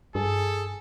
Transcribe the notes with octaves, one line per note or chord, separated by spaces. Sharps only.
G2 G#4 A4